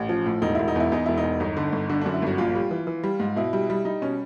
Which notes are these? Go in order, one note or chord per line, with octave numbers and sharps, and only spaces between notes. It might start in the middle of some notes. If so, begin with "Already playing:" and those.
Already playing: A1 C#4
F3
A2
E1 D#4
E1 E4
D#4
E2 E4
E2 D#4
E1 E4
D#4
E2
G1 D#4
D3
G1
D3 D4
F#2 D4
E4
G1 F#4
A#1 F4
G3
E3
E3
G3
G#2
B2 E4
G3
G3
G3 D#4
B2 C#4